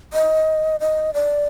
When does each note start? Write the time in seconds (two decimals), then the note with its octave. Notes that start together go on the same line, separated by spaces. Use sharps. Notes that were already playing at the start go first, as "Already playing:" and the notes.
0.13 D#5
0.80 D#5
1.14 D5